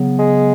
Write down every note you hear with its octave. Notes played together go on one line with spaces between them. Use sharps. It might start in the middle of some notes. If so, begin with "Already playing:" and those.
Already playing: C#3 F#3 B3
G#3